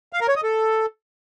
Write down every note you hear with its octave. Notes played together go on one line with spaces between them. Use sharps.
F5
A#4
C#5
D#5
A4